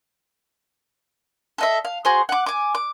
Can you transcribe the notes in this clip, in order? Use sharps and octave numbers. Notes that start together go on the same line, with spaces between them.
A4 D#5 E5
F5
F#4 G#4 C5
F#5 D6
G#5 D6
D6